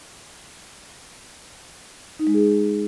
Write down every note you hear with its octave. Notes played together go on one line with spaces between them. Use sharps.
D#4
G#3
G#4